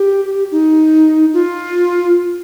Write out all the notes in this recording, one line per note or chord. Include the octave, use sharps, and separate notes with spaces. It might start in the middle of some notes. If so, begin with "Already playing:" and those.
Already playing: G4
D#4
F4